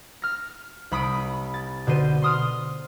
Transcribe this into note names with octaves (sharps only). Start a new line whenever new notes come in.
F6 A#6
C2 B5 D#6 D7
A6
B2 D3 C5 D#7
C6 D#6 F6